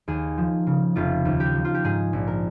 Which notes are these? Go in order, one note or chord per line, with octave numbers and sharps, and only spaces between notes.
D#2 G#4
F3
C#3
F1 F4
D#2
G4
F3
F4
G4
G#2 G#4
A#1
A#4